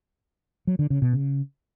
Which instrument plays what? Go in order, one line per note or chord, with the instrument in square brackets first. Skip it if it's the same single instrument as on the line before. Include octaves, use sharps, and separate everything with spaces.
[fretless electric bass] F#3
D3
C#3
B2
C#3